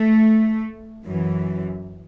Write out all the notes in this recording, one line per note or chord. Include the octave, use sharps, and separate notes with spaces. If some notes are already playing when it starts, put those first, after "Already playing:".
Already playing: A3
F#2 E3